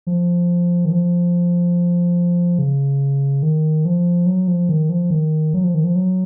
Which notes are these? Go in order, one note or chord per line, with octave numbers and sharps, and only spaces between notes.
F3
D#3
F3
C#3
D#3
F3
F#3
F3
D#3
F3
D#3
F#3
F3
D#3
F3
F#3